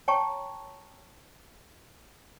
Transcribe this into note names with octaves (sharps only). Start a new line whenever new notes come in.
C#5 G5 A5 A#5 C#6